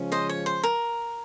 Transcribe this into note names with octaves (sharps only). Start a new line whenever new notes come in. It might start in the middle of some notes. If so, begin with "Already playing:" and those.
Already playing: C#3 F3 G#3 C#4
C5 D#5
C#5
C5
A#4